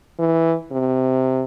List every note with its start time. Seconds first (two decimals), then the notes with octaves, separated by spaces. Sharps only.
0.19 E3
0.71 C3